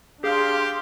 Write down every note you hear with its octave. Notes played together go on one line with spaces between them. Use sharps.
D4 G4 G#4 F5 C6